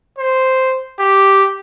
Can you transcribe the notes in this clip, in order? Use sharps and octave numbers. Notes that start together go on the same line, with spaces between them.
C5
G4